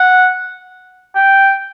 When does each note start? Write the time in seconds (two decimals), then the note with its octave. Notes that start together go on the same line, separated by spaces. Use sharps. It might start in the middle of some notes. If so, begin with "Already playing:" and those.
Already playing: F#5
1.15 G5